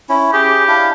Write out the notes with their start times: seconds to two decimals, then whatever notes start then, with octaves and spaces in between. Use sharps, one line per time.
0.09 C#4 E4
0.33 G4 G#4
0.68 D4 E4 F5